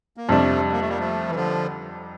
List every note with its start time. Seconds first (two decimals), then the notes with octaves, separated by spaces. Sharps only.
0.17 A#3
0.29 F2 C3 F3 G3 A3 D4
0.72 A#3
0.81 A3
0.89 G3 A#3
0.99 F3 A3
1.29 E3
1.35 D3 F3